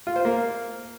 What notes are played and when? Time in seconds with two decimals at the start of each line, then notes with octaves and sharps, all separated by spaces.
0.07 F4
0.16 C5
0.25 A#3